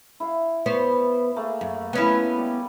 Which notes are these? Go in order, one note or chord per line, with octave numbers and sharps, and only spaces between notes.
E4 E5 F5
B3 C5 C#5
A3 A#3 G#4
F#2
B3 C#4 E4
G3 D5